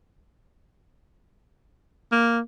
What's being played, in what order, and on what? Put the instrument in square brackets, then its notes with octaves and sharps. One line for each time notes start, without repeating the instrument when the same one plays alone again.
[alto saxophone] A#3